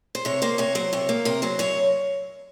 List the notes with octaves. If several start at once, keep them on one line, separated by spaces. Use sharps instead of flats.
C5
C3 C#5
A#3 C5
C3 C#5
F#3 C5
C3 C#5
A#3
C3 A#4
F#3 C5
F#2 C#5